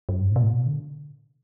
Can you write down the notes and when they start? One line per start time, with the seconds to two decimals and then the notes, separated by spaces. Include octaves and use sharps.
0.09 F#2
0.20 G2
0.31 A2
0.36 B2
0.42 A2
0.52 B2
0.66 D3